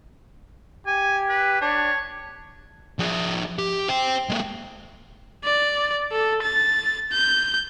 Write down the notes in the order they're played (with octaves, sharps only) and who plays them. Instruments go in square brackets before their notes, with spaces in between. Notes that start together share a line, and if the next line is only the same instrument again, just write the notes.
[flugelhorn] G4 [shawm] G#5
[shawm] B4
[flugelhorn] D4 [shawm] C#5
[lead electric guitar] F3 G#4
G4
C5 G5
G#3 A#3
[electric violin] D5
A4
A6
G6